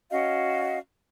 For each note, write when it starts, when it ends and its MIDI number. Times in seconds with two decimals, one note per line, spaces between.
0.11 0.79 61
0.11 0.79 66
0.11 0.79 75
0.11 0.79 77